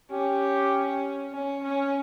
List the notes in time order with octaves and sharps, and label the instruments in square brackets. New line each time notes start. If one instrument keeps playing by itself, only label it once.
[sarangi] C#4 [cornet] G4
[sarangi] C#4
C#4